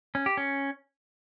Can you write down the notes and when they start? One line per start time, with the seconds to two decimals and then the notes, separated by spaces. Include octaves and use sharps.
0.15 C#4
0.26 G4
0.37 C#4